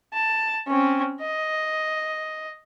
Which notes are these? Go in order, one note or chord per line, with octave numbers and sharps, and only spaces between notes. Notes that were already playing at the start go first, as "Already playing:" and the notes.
A5
C4 C#4
D#5